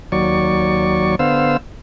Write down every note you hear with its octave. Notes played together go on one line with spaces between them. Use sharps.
D#2 F#3 D5 C#6
D3 B3 C5 F5 E6